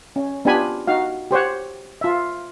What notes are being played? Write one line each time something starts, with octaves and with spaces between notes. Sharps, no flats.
C#4
B3 D4 F4 G4 G#5 B5
D#4 F#4 F5
G4 C5 C#5 F#5
F4 E5